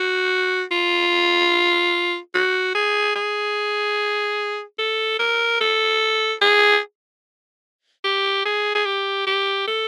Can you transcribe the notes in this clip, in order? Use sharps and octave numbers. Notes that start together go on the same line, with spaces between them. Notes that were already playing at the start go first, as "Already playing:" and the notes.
Already playing: F#4
F4
F#4
G#4
G#4
A4
A#4
A4
G#4
G4
G#4
G#4
G4
G4
A4